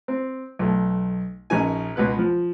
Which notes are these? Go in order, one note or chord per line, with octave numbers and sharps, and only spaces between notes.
C4
B1 A3
A#1 C#4 D#4 G#5
C#2 B2 B4 F#6
F3